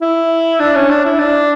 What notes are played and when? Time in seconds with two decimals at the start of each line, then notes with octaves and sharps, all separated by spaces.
0.02 E4
0.60 D4
0.75 C#4
0.90 D4
1.05 E4
1.19 D4